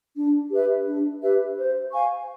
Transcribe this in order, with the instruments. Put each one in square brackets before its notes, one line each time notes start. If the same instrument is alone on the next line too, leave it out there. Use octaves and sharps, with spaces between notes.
[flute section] D4
G4 B4 E5
D4
G4 B4 E5
C5
F5 G#5 C#6